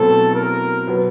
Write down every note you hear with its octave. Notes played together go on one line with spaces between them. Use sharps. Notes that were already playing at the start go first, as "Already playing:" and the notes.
Already playing: B2 F#3 A3 C4 E4 A4
A#4
B2 F#3 B3